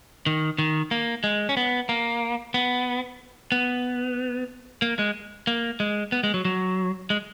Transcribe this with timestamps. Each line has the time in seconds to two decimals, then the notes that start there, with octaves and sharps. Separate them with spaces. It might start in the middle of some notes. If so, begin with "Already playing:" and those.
0.26 D#3
0.58 D#3
0.91 A#3
1.24 G#3
1.49 C#4
1.57 B3
1.89 A#3
2.54 B3
3.52 B3
4.82 A#3
4.99 G#3
5.47 A#3
5.80 G#3
6.12 B3
6.24 G#3
6.34 F#3
6.45 F#3
7.10 G#3